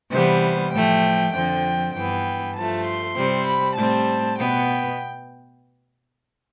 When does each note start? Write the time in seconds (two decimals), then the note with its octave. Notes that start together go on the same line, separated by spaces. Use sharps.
0.11 C3 E3 G3 B3 C5
0.72 A2 F3 A3 G5
1.32 F2 D3 F3 C4 G5
1.93 G2 E3 B3 G5
2.55 G2 F3 A3 A5
2.85 C6
3.16 C3 G3 C4
3.46 B5
3.76 A2 G3 C4 A5
4.37 B2 B3 G5